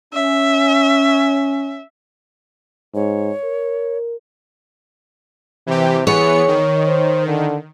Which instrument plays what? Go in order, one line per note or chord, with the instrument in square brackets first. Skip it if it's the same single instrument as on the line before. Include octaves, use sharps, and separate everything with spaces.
[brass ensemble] C#4 [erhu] E5
[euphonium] G#2 [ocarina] C#5
[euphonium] A#4
[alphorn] C3 [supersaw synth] E3 G4
[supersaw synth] E3 B3 C#7 [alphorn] G#4 [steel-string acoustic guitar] C#5
[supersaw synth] D#3
[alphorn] C5
D3